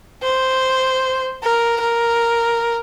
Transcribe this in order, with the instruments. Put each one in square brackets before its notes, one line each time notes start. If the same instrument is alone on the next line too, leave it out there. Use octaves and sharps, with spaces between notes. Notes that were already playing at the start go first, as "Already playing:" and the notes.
[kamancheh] C5
A#4
A#4